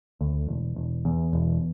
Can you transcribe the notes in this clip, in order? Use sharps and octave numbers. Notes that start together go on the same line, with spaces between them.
D2
E1
E1
E2
E1